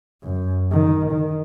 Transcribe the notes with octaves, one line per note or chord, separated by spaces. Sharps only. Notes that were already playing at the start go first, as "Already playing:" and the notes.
F#2
D#3
D#3